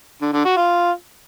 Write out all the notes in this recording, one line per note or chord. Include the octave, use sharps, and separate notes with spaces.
D3
D3
F#4
F4